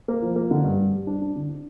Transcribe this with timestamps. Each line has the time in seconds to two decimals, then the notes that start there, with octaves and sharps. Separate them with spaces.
0.08 A#3
0.22 F3
0.36 A#3
0.51 D3
0.64 G2
0.78 G3
0.93 G3
1.07 D4
1.22 D4
1.36 D3
1.49 D4